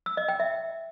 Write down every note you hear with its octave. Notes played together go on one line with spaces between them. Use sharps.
E6
D#5
G5
E5